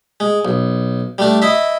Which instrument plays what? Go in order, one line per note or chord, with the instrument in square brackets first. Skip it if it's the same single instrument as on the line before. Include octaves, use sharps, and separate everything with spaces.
[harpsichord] G#3
B1
G3 A3 D4
E4 D#5 E5